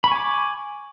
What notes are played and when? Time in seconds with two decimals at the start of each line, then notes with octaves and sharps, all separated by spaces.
0.04 B5
0.08 C#6
0.12 G#5
0.15 D6